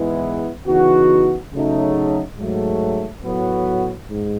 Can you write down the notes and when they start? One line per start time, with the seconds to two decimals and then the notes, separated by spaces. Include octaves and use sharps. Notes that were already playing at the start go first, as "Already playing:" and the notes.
Already playing: G#2 E3 G#3 B3 E4
0.67 C#3 E3 B3 D#4 F#4
1.53 C#3 F#3 A3 D#4
2.38 G#2 F#3 A3
3.23 A2 F#3 B3 F#4
4.09 G#2